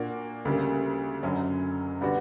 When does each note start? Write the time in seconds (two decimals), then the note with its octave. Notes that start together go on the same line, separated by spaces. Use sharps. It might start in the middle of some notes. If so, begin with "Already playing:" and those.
Already playing: A#2 A#3 D4 F#4
0.45 D2 C#3 G3 A#3
1.23 F#1 F#2 D3 F#3 C#4
2.01 D3 G3 B3 D4 F#4